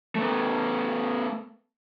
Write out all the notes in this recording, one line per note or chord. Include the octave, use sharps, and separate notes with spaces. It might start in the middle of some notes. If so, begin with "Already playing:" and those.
A3 B3